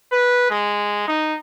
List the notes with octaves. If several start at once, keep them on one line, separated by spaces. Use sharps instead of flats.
B4
G#3
D#4